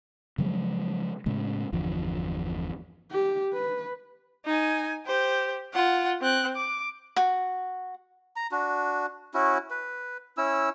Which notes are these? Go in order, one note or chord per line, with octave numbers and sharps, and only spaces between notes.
C#3 F3 F#3 G#3
A2 C#3 G#3
G1 E2 D3 F3
G4
B4
D#4 G#5
G4 C5
F4 F#5
C4 F#6
D6
F#4
A#5
D4 F#4
C#4 E4 F#4
B4
C#4 E4 E6